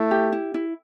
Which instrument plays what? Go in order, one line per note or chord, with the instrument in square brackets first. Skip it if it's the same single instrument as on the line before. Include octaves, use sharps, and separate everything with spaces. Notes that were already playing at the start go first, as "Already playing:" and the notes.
Already playing: [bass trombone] A3 [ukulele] E4
[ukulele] G4
E4
E4